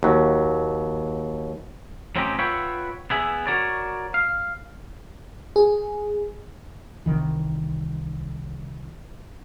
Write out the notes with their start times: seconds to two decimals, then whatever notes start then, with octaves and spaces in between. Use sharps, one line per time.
0.03 D#2 F#3
2.16 A2 F#3 C4 C#4 D#4 G4
2.39 F4 B4 C#5 E5 F#5 G5
3.10 B3 E4 G#4 E5
3.47 F#4 A#4 C#5 D5
4.14 F5
5.56 G#4
7.06 C2 D#3 E3